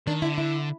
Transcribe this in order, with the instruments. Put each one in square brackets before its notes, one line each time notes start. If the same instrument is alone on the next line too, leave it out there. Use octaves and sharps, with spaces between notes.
[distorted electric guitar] D#3 [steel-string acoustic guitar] D4
[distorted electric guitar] D3 [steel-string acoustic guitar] E4
[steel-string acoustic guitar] E4